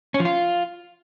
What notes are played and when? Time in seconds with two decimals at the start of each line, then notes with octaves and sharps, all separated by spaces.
0.14 C#4
0.20 F3
0.25 F4